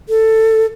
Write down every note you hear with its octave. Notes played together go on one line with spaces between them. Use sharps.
A4